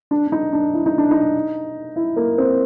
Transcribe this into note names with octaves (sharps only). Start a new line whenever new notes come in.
D4
D4
D#4
D4
E4
D#4
D4
D#4
E4
A#3
C4